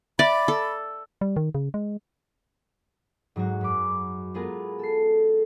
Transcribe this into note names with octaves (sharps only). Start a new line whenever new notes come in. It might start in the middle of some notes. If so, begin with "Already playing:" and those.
D5 E5 B5
A4
G3
D#3
C#3
G#3
G#2 F#3 G#3 F#4
F#2 B5 D6
G#3 B3 F4 G#4 A#4
A4 C7